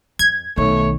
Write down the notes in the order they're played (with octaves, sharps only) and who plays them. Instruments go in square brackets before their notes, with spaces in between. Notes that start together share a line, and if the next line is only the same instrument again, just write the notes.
[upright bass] F2 [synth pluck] G#6
[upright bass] B1 D#3 [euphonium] A3 [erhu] C#5